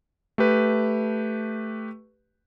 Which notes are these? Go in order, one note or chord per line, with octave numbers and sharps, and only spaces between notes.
A3 G4 B4